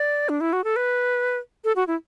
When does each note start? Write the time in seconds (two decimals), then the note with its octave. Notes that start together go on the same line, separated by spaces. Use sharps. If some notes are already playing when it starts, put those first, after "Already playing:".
Already playing: D5
0.29 D4
0.41 E4
0.53 F#4
0.64 A4
0.76 B4
1.64 A4
1.76 F#4
1.87 E4